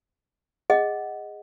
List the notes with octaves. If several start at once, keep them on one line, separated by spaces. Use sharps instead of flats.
G#4 D#5 F#5